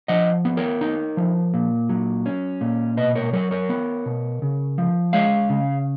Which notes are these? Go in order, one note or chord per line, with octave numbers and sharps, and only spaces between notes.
F3 D#5 F#5
B3
A#4 C#5
D#4
F3
A#2
F#3
C#4
A#2
B2 B4 D#5
A#4 C#5
F#3 A#4 C#5
A#4 C#5
B3
B2
C#3
F3
G#3 C#5 F5
C#3